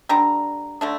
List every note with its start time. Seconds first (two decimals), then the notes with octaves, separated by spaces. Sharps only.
0.09 D3 G3 D4 A#5
0.81 D3 A3 D4